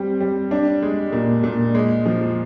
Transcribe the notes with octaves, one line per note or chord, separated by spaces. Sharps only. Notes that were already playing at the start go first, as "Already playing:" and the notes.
Already playing: G3 C4
G3
D4
G#3
A#2
A#2
G#3
F3